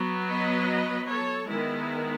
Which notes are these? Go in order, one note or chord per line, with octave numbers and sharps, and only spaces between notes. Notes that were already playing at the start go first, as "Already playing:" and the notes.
Already playing: F#3 B3
B4 D#5
A4 C#5
D#3 G#3 B3 E4